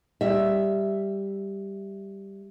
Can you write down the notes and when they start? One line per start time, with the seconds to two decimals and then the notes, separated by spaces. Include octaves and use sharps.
0.21 G3 E5